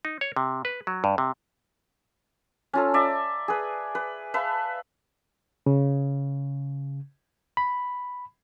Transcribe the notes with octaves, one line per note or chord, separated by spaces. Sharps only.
D#4
C#5
C3
B4
F#3
G2
C3
C#4 F4 A4
D5 E5 A#5
G#4 B4
B4
B4 E5 F5 A5
C#3
B5